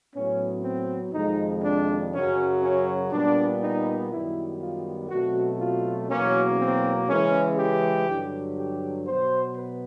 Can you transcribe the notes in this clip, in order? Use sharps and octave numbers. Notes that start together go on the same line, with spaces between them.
A2 F#3 B3 C#4
C4
F2 C3 D#3 G#3 D#4
D4
F#2 C#3 F#3 C#4
C#4
A#2 G3 B3 D4
D#4
F#2 D#3 G3 B3 E4
F4
B2 F#3 A3 C4 F#4
F4
E2 B2 F#3 A#3 C#4
C4
C#3 E3 G#3 C#4
G4
G2 D3 F#3
G4
B2 F#3 B3 C5
B4